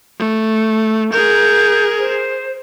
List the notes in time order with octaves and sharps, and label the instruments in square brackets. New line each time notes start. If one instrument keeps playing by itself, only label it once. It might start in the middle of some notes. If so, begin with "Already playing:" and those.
[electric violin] A3
[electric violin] G#4 A#4 [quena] G6
[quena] C5